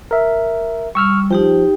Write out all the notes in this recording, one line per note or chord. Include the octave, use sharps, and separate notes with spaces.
A#4 E5
G3 C#6 E6 F6
F3 D#4 G4 G5